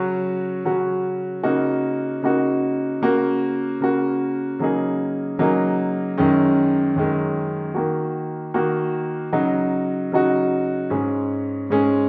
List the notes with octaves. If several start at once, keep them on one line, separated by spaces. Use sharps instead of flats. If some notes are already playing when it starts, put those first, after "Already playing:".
Already playing: C#3 F#3 C#4 F#4
C#3 F#3 C#4 F#4
C#3 A#3 D#4 F#4
C#3 A#3 D#4 F#4
C#3 A#3 F#4
C#3 A#3 F#4
C#3 F#3 A#3 D#4 G#4
C#3 F#3 A#3 D#4 G#4
F#2 D#3 G#3 C#4
F#2 D#3 G#3 C#4
D#3 A#3 F#4
D#3 A#3 F#4
C#3 F#3 D#4 F#4
C#3 F#3 D#4 F#4
G#2 G#3 C#4 G#4
G#2 G#3 C#4 G#4